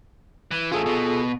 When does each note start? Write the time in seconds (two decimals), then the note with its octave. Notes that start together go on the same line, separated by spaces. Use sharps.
0.51 E3
0.72 A2 C#4 F4 G#4 A4
0.86 B2